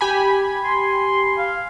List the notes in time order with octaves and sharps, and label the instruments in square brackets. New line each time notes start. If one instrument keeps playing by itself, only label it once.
[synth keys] G4 G#5 B5
[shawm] C6
F5